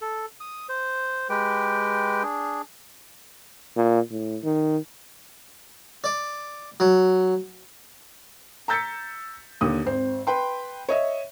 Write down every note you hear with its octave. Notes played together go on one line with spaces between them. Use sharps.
A4
D#6
C5
G#3 G4 B4 G5
D4 G#4
A#2
A2
D#3
D5
F#3
A#5 E6 G6 A6 B6 C#7
D#2 D3 D#6
G#1 C4
B4 G5 C6
C#5 D#5 E5